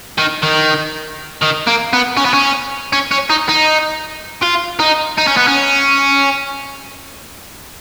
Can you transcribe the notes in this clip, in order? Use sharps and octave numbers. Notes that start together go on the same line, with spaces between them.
D#3
D#3
D#3
A#3
B3
C#4
B3
C#4
C#4
C#4
D#4
D#4
F4
D#4
D#4
C#4
B3
C#4